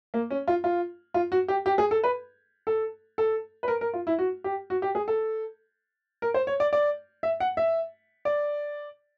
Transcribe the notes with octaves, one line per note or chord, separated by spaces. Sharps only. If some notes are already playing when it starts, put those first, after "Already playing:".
A#3
C#4
F4
F4
F4
F#4
G4
G4
G#4
A4
B4
A4
A4
B4
A#4
A#4
F4
E4
F#4
G4
F#4
G4
G#4
A4
A#4
C5
C#5
D5
D5
E5
F#5
E5
D5